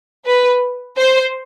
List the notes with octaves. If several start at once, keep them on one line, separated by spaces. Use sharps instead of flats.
B4
C5